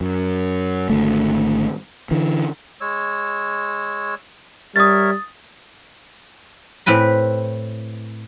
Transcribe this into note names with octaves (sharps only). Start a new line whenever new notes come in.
F#2
G#1 D3 A3
D3 E3
G#3 C#5 E6
G3 A#4 C#5 E5 D#6 A6
A2 C4 B4 B5